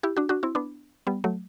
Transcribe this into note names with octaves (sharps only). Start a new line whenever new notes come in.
E4 G4
D4 F#4
D4 F#4
C4 E4
B3 D4
G3 B3
F#3 A3